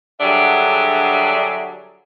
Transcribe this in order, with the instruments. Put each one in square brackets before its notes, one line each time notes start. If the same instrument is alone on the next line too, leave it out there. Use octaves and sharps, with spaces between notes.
[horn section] D3 F#3 G3 D4 G#4 E5